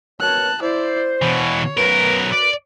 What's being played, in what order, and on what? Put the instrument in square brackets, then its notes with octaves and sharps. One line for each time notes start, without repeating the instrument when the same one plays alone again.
[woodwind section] B2 A#4 C#5 [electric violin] A5 F#6
[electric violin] E4 D5 [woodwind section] C5
[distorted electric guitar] B2 E3 [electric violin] C#5
[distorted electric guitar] B1 A#4 [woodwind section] F#2 B4
[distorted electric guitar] D5